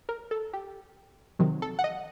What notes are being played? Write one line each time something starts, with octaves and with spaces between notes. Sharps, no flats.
A#4
A4
G4
C3 D#3 F#3
A4
F#5
D#5